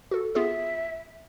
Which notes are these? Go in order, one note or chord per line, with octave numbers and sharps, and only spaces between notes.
F#4 A4
B3 F4 G#4 E5